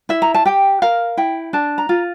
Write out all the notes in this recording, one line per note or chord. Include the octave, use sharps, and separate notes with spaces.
E4 E5
A#5
A5
G4 G5
A#4 F5
E4 G5
D4 A5
A#5
F4